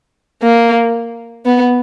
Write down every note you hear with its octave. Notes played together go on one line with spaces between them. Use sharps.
A#3
B3